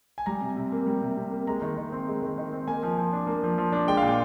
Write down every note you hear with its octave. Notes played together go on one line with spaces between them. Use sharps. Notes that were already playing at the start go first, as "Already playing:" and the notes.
G#5
G3 A#5
C3
C3
A#3
G3
C3
C3
A#3
G#3 A#5
D#3
D#3
C4
G#3
D#3
D#3
C4
A#3 G#5
F3
F3
D4
A#3
F3
F3
D4
G#3 G5
A#2 F5
G5